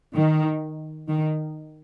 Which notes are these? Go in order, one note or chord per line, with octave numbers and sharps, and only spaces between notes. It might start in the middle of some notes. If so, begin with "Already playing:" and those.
D#3
D#3